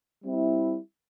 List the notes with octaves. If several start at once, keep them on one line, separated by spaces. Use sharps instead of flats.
G3 C4 E4